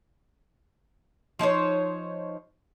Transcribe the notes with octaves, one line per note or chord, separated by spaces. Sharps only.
F3 D#4 C5 C#5